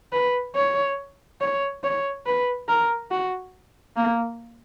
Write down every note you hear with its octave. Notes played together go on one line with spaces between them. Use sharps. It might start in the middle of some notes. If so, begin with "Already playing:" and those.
B4
C#5
C#5
C#5
B4
A#4
F#4
A#3